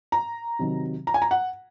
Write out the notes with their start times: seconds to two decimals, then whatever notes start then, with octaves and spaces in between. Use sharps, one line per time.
0.12 A#5
0.59 C3 D#3 F#3
1.07 A#5
1.14 G#5
1.22 A#5
1.31 F#5